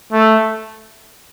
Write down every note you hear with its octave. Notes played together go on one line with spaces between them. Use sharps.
A3